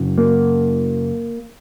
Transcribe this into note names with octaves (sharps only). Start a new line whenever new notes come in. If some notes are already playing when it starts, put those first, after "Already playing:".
Already playing: F#2 C#3
A#3